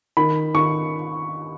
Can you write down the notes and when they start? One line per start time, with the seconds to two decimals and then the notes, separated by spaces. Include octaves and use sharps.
0.17 D#3 B5
0.55 D#3 C#6